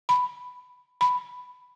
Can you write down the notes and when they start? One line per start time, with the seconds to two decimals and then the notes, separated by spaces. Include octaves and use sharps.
0.09 B5
1.01 B5